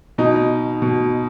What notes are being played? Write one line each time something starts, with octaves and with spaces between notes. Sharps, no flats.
B2 D#4
B2